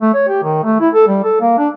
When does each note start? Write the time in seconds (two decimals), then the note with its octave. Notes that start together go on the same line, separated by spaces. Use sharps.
0.02 A3
0.14 C#5
0.28 G4
0.43 D#3
0.63 A3
0.80 E4
0.94 A4
1.08 G3
1.24 A4
1.41 A#3
1.58 D4